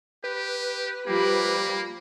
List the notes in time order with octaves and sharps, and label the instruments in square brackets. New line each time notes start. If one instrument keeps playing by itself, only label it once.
[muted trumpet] G4 [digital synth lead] B4
[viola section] F3 G3 B5 [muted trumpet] A#3 [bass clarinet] G4